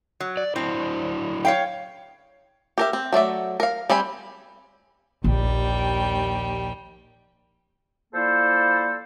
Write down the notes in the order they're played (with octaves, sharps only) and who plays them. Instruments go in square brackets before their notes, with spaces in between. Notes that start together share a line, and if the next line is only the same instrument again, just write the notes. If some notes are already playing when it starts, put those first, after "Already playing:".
[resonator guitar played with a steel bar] F#3
[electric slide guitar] D5
[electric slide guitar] F#3 D4 E4 [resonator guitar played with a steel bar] C4
[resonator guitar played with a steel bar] C#5 F5 G5
[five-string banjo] G4 A#4 E5
C4
F#3 A3 D5 E5
A#4 F5
G3 C4 G#5 B5
[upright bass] A#1 [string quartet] D#2 G3 G5
[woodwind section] F3 A#3 E4 A4 C5 D5